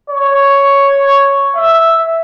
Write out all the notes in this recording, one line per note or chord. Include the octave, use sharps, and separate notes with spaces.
C#5
E5